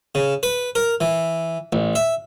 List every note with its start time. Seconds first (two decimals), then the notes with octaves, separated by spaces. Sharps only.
0.15 C#3
0.43 B4
0.75 A#4
1.01 E3
1.73 A1
1.95 E5